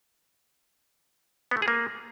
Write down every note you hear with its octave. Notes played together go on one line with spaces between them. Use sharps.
B3
A3
G#4
A#3